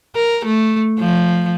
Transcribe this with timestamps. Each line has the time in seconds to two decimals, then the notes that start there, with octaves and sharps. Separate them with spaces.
0.15 A#4
0.46 A3
0.99 F3